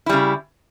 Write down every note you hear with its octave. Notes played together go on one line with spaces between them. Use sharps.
C#3 G3 E4